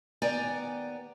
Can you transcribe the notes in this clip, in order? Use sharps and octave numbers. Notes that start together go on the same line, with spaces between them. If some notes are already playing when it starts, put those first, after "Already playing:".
D#2 B3 D5 G5 G#5 A#5